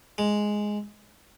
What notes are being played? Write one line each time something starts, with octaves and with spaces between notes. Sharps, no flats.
G#3